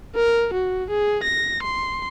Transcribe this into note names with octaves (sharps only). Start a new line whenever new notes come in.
A#4
F#4
G#4
A#6
C6